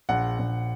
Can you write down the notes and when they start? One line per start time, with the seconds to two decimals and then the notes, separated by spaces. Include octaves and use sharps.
0.09 A#1 F#5
0.39 A#1